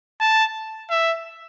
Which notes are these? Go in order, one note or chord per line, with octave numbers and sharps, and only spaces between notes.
A5
E5